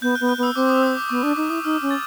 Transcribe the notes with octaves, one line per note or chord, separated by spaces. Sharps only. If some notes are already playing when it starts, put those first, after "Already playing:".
B3 G6
F#6
B3
F#6
B3
E6
C4 D6
D#6
E6
D6
B3 C#6
D4 D6
D#4 D#6
E4 D#6
D#4 F6
C#4
A6